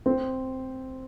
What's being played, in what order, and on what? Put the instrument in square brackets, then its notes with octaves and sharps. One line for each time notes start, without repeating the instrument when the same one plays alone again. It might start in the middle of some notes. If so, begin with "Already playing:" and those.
[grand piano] C4